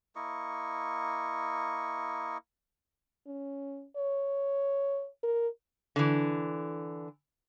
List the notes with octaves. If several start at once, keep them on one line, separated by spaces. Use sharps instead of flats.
A#3 E4 D#5 C#6
C#4
C#5
A#4
D3 E3